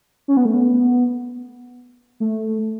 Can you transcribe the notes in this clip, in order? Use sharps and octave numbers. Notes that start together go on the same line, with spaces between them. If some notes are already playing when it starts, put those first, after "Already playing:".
C#4
B3
A3
B3
A3